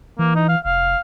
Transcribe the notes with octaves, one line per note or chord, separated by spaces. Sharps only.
E3 A#3
D#4
F5
F1 F5